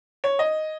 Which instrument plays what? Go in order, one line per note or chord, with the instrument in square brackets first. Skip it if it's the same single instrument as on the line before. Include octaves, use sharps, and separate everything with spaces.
[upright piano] C#5
D#5